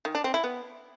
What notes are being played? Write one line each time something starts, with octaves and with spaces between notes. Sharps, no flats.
D#3
D4
C4
E4
B3